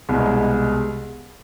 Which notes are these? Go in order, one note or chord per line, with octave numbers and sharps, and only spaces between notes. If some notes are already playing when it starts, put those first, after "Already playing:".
C2 B2 G#3 B3